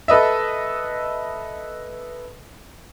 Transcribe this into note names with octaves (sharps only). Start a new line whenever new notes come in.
A4 B4 D#5 E5